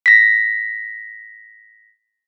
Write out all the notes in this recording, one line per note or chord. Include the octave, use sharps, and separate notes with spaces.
A#6 B6